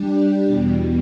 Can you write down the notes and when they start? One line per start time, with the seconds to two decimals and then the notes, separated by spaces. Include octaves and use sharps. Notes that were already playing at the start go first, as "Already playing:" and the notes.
Already playing: G3 D4 G4
0.46 E2 B2 G3